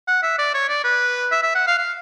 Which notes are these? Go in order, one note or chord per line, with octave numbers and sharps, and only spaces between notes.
F#5
E5
D5
C#5
D5
B4
E5
E5
F#5
F5
F5